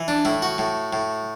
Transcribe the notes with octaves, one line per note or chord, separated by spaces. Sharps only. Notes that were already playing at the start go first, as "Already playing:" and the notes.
Already playing: E3
D4
A2 E4
F#4
A2
A2